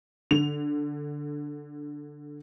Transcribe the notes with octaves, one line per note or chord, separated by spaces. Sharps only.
D3 F7